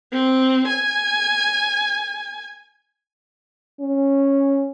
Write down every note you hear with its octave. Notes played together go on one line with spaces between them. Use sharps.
C4
G#5
C#4